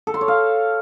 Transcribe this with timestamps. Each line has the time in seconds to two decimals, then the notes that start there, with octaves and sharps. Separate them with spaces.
0.07 A4
0.14 C6
0.21 C#5
0.28 F5